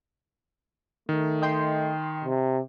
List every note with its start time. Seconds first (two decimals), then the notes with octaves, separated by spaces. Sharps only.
1.09 D#3 A3
1.42 D#5 G5 C6
2.24 C3